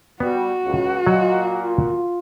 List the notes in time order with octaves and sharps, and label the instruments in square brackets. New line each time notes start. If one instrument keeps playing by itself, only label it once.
[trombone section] G3 [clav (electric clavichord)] B3 [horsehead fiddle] F#4
[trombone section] C#2
[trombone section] A#2 [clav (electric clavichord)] F#3 F#5 G5 [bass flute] D#5
[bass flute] F4